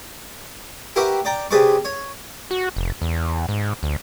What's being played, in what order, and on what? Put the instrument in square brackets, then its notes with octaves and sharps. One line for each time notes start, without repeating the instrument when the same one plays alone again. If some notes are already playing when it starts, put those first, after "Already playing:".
[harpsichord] G4 A#4 B4 E5 F#5 C#6
D5 G5 A#5
C3 G#4 B4 D5 C#6
C#5
[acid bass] F#4
F1
E2
G#2
D2